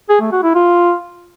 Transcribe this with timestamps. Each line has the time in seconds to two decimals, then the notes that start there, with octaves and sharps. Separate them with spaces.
0.09 G#4
0.20 A3
0.32 F#4
0.43 E4
0.55 F4